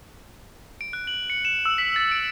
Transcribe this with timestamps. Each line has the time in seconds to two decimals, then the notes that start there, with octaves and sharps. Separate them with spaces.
0.81 D7
0.93 F#6
1.07 F#7
1.30 C#7
1.45 E7
1.65 E6
1.78 B6
1.96 A6
2.12 D7